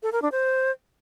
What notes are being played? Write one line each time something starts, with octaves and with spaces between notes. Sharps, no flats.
A4
A#4
D4
C5